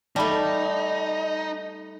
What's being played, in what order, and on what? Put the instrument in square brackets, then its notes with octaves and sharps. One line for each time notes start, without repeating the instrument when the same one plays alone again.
[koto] G3 A3 [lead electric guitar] D#4 [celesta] A5 B5